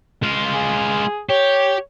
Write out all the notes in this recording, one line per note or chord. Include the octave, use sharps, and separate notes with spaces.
G#3 F4
G#4
G4 C#5